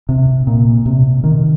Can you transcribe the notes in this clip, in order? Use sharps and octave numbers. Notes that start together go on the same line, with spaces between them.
C3
A#2
C3
D#3